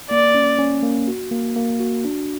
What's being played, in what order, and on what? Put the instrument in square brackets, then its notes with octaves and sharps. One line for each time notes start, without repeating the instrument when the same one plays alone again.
[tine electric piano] A#3 [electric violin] D5
[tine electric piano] C#4
C#4
A#3
F#4
A#3
A#3
F#4
D4